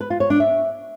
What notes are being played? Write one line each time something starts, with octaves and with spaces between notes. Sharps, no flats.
B4
F4
C#5
D4
E5